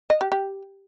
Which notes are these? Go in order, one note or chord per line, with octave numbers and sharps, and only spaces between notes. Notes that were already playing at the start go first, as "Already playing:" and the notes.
D#5
G4
G4